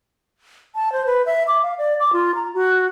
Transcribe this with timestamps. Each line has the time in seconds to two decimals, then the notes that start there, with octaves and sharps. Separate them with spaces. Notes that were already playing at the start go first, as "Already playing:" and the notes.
0.75 A5
0.93 C5
1.06 B4
1.26 E5
1.48 D6
1.63 F5
1.78 D5
2.00 D6
2.13 F4
2.35 A#5
2.54 F#4